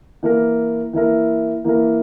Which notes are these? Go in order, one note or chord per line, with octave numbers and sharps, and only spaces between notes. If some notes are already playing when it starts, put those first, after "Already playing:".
E3 A#3 E4 A#4
E3 A#3 E4 A#4
E3 A#3 E4 A#4